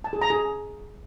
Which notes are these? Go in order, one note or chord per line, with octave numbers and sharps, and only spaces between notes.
A5
G#4
A#5
G#4